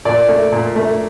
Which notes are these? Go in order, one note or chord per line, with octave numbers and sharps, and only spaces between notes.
A#2 D5
A3
A#2
A3